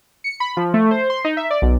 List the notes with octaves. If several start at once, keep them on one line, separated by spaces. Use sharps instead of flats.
C#7
B5
F3
A3
C5
C6
D#4
E5
D5
B1